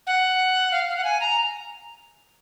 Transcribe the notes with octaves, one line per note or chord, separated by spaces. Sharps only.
F#5
F5
F5
F#5
G#5
A#5